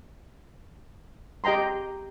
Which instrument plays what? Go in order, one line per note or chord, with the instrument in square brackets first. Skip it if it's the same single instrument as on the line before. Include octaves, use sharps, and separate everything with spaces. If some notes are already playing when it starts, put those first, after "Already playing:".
[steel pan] G4 D#5 G5 A#5 C6